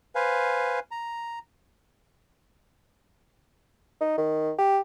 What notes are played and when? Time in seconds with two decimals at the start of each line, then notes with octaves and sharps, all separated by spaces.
0.15 B4 C5 F5 G#5
0.91 A#5
4.01 D#4
4.18 D#3
4.58 G4